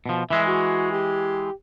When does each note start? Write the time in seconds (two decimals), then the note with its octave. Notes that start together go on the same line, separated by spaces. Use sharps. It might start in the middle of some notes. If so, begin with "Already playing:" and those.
0.06 B2 F3
0.30 E3 G#3 E5
0.47 F#4
0.92 G4